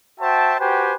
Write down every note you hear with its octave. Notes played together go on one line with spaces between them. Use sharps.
F#4 C5 E5 G5 A5
F#4 G4 B4 C5 G5 G#5